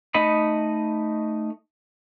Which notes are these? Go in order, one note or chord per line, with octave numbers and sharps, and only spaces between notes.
A3 D#4 D#5 B5